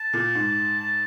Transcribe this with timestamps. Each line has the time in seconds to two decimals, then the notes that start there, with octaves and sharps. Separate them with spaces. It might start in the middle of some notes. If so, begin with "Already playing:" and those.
Already playing: A5
0.13 A#2
0.35 G#2
0.80 A5